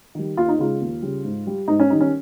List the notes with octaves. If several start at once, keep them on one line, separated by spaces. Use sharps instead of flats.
D#3 G3
D#2 F4
D#4
C#3 G#3 F4
D#2
C#3 G3
G#2
G3
G#2 D#4
C#4
D#3 G3 D#4
C#4